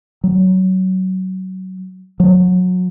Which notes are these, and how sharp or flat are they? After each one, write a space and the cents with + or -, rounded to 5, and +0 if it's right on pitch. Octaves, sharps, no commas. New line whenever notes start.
F#3 +20
F#3 -25